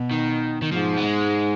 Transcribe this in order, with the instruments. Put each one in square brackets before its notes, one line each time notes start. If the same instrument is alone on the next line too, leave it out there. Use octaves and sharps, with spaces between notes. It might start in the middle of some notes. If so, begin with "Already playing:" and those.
Already playing: [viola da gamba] B2
[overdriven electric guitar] D#3
D#3
[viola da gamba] G#2 [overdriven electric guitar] F3
[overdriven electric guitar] B3
G#3